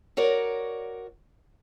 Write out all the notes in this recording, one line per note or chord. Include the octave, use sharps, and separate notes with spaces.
F#4 A#4 C#5 D5